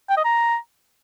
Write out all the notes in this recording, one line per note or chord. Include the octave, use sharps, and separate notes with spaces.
G5
D#5
A#5